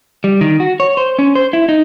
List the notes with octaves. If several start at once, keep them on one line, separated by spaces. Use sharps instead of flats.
G3
D#3
F#4
C#5
C5
C#4
C5
E4
D#4